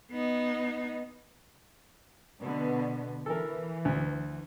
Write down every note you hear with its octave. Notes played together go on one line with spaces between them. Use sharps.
B3 D#4
B2 D3 B3
E3 A4 A#4
D2